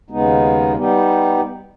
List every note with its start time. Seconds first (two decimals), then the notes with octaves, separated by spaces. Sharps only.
0.10 D#2 C#3 G#3 B3 D#4
0.76 G3 B3 D#4 G4